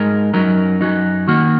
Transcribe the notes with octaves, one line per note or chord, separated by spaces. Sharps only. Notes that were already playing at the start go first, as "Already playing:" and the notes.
Already playing: G#2 G#3 D#4 A#4
F#2 F#3 D#4 A#4
F#2 F#3 D#4
D#3 A#3 F#4